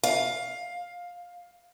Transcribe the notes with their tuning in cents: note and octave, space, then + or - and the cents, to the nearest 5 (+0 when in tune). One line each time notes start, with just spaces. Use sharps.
F5 +15